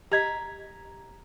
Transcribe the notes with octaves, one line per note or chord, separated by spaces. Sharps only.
G4 D#5 A#5 G#6 B6